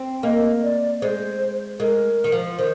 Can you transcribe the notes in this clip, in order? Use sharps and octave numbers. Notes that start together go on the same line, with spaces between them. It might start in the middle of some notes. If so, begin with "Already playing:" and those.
Already playing: C4
A#3 D#5
D5
G#3 C5
G#3 A#4
D#3
F3
D#3 C5